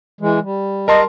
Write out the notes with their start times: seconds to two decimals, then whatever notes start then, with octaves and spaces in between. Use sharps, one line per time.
0.21 E3 G#3
0.43 G3
0.88 A#4 D#5 A5 C6